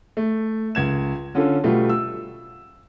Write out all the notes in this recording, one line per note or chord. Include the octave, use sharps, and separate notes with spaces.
A3
C#2 G#6 E7
D3 C#4 F4 A4
B2 G3 A3 F4
E6